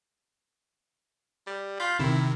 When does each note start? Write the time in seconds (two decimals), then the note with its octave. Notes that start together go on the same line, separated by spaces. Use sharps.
1.47 G3
1.80 F4 B5 G6
1.99 C3 D#3 E4